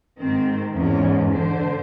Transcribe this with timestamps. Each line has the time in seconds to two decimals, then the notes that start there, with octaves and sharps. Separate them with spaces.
0.18 G#2 D#3 C4
0.73 E2 G#2 C#4
1.32 G#2 D3 C5